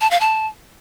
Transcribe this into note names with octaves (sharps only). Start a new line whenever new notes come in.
A5
F5
A5